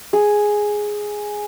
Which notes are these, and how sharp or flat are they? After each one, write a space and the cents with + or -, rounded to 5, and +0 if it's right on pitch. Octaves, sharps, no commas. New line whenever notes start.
G#4 +0